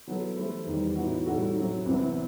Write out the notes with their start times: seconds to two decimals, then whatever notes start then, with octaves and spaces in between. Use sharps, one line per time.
0.07 F#3 B3 E4 A4
0.37 E3 A3 E4 G4 C5
0.66 E2 D#3 G3 D#4
0.96 A2 E3 B3 D#4 F#4
1.26 A2 G3 D#4 F#4 A4
1.55 A2 F#3 C4
1.86 C2 C3 E3 B3